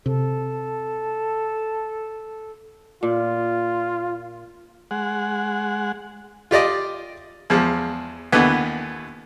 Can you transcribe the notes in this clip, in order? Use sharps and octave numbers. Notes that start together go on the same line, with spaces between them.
C3 A4
A#2 F4
G#3 F#5
F4 G4 D5 D#5
E2 F3 G#3
D#2 D3 E3 B3